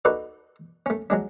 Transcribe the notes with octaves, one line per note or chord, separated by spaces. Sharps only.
D#4 F#4 A4 B4 D5
A3 C#4
F#3 G#3 D4